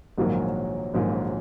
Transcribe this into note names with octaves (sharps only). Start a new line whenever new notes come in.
A#1 G#2 D#3 F#3 A#3
A#1 G#2 D#3 F#3 A#3